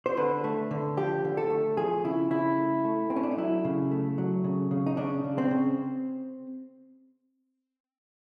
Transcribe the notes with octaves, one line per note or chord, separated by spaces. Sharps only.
C5
D3 B4
A3
D3
F3 G4
D3
A4
A3
F3 G#4
C#3 E4
C#3 E4
A3
A3
A3 C4
C#4
D4
D#4
F#3 E4
C#3
A3
F#3
C#3
C#3
D#4
C#3 D4
C#3
C4
C#3